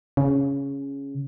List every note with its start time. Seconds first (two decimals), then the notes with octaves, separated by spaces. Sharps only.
0.17 C#3